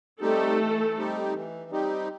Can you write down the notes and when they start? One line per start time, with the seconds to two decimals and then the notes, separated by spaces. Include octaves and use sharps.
0.21 G3 A3 C4 D#4 G4 A4
0.58 E3
0.96 G3 C4 D#4 G4
1.34 E3
1.70 G3 C4 D#4 G4